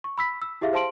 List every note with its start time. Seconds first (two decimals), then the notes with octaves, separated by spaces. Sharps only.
0.04 C#6
0.18 B5 E6 B6
0.42 E6
0.61 E4 G4 G#4 E5 F5
0.73 C5 F5 A5 C6 D7 F#7